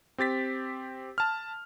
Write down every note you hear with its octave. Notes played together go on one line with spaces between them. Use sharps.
C4 G4 A6 B6
A5 F6